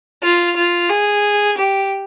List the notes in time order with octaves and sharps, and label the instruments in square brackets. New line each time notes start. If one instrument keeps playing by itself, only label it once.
[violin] F4
F4
G#4
G4